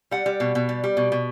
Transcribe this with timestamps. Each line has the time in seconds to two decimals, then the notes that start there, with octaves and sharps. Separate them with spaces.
0.11 G3 F#5
0.26 G3
0.40 B2
0.55 B2
0.69 G3
0.84 G3
0.97 B2
1.12 B2